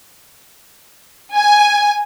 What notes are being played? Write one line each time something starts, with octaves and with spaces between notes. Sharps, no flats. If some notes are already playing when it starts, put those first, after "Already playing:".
G#5